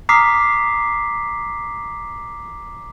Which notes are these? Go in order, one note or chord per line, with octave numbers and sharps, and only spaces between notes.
A#5 D6 D#6 F6 B6 C7